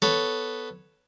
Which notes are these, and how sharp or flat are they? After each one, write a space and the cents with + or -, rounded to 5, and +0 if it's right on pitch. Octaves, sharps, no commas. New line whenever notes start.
B3 +0 A4 +0 C#5 +0